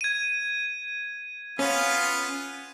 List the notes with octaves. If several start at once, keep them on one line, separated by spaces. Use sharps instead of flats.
G#6 D#7
B3 C#4 F4 F5